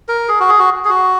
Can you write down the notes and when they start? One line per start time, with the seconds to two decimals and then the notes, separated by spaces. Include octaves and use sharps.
0.08 A#4
0.28 G#4
0.40 F#4
0.49 G#4
0.59 F#4
0.85 G#4
0.89 F#4